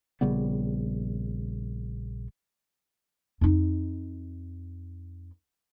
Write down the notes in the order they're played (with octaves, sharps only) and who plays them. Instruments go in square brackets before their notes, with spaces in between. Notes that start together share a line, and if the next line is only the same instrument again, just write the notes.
[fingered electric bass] A#1 C#3 G3 B3
[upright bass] F2 D#4